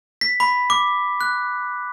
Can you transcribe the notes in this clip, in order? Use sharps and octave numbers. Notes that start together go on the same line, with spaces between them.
B6
B5
D6
F#6